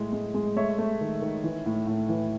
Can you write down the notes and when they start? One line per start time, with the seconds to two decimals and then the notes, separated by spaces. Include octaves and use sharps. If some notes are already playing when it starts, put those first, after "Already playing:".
Already playing: A2 G#3
0.13 G#3
0.34 G#3
0.56 A3 C#5 E5
0.78 A3
1.01 D#3
1.22 D#3
1.44 E3
1.66 A2
1.87 A2
2.09 E3